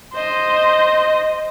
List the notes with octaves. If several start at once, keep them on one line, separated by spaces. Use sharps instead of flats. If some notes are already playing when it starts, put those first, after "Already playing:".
C5 D#5